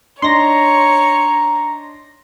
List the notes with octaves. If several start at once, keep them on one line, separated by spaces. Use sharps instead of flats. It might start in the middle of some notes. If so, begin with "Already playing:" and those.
D4 D#4 C#5 A#5 C6 A#6